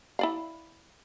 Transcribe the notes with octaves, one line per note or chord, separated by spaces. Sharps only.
E4 D5 F5